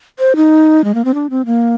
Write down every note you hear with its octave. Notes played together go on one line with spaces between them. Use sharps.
C5
D#4
G#3
A#3
C4
D4
C4
A#3